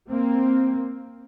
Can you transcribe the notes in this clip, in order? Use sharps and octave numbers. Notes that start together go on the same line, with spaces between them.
A#3 C4